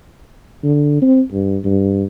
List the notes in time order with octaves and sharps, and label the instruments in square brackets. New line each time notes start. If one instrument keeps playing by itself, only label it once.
[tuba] D3
C4
G2
G2